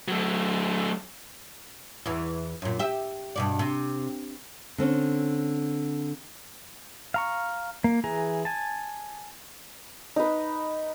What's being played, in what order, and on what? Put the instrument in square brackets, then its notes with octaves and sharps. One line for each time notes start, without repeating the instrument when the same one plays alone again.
[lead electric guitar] F#3 A3
[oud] E2 E3
F#2 A#2
G4 E5
G2 B2 D5
C3
[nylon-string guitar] D3 C4 C#4
[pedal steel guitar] F5 A#5 C#6
A#3
E3 G#4 A#5
G#5 A5
[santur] D#4 B4